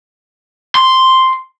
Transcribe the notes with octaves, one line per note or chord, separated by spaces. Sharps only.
C6